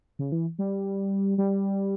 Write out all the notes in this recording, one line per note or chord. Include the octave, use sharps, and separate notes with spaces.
C#3
E3
G3
G3